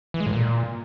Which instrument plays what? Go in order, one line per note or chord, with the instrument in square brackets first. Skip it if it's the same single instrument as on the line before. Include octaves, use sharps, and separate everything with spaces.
[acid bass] E3
G#3
A2
A#2